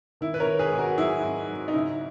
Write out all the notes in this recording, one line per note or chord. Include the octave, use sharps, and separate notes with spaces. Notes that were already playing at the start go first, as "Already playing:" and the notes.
D#3 E4
B4
A#4 C#5
D#3
G#4 B4
G#2
F#4 A#4
F#3 E4 G#4
G#2
F#3
D#4
C#3 E4